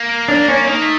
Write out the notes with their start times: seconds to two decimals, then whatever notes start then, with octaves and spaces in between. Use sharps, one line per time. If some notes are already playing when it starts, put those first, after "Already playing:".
Already playing: A#3
0.28 D4
0.48 C#4
0.68 A#3 D#4
0.82 A3